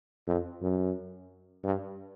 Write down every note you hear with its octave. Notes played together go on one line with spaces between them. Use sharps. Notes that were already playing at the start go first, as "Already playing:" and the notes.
F2
F#2
G2